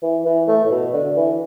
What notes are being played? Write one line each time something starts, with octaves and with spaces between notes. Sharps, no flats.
E3
E3
A3
A2
B2
D3
E3